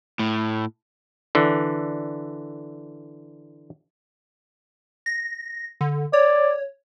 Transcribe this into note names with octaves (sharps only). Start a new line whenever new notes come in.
A2
D3 E3
A#6
D3
C#5 D5